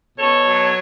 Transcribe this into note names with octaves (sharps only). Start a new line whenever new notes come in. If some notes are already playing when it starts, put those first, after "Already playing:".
B2 A4 C#5
F#3